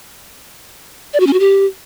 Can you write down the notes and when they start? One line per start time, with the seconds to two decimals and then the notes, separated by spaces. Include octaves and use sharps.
1.13 D5
1.20 F#4
1.27 C#4
1.33 F#4
1.40 G4